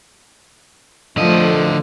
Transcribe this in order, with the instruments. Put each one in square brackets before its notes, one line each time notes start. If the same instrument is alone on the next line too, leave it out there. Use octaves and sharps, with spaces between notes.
[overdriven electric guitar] D3 D#5 [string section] F3 A3